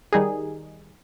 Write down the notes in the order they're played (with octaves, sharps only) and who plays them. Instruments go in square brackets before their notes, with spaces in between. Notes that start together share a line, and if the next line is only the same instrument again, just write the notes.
[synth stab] D#3 G3 D#4 G#4